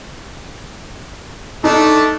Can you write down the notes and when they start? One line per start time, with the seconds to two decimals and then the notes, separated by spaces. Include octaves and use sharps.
1.64 A3 D4 D#4 A4